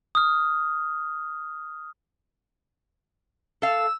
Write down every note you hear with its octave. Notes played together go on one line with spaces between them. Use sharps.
D#6 F6
A4 F5 E6